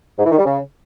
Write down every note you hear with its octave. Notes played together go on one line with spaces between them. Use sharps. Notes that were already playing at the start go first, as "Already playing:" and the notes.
G#2
E3
D#3
G3
C#3